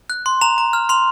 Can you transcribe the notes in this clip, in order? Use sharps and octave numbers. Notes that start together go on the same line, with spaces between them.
F#6
C6
A#5 F7
A#5
F6
C6 F7